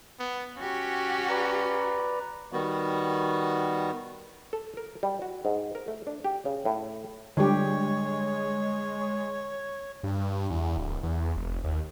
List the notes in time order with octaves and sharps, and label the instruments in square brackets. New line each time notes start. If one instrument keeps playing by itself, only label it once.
[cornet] B3
[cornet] C#4 [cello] F#4 G4
[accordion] B4 D5 A#5
[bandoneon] D#3 G3 B3 F#4
[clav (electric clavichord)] A4
A#4
G3
F#4
G#2
A#4
A3
D4
G4
C#3
A2
[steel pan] D3 G3 G4 [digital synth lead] G#3 [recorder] C#5
[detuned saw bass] G2
E2
D1
E2
F1
D#2